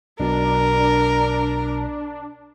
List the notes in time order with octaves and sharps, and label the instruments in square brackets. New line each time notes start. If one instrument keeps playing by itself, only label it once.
[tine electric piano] B1 B2 [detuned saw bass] D4 [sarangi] A#4